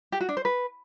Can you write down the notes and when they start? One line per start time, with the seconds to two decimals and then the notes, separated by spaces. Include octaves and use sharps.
0.12 G4
0.20 F#4
0.29 D4
0.37 C5
0.45 B4